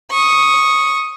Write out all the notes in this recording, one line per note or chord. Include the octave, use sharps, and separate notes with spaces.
C#6 D#6